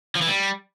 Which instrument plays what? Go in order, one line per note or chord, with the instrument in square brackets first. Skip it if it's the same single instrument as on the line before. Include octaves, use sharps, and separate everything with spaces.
[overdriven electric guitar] F3
E3
G3